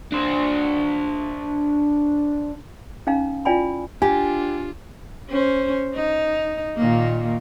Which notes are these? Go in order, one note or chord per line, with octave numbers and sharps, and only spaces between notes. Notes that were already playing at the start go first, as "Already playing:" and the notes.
D4 C5
C#4 D#4 F5 A#5
E4 F4 D5 G5 G#5 B5
D4 F4 G4 G#5
C#4 C5
D#4
A#2 D#3 A#3